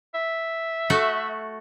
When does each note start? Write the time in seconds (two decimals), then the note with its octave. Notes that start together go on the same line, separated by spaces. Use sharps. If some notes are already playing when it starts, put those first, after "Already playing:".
0.14 E5
0.90 A3 F#4 A4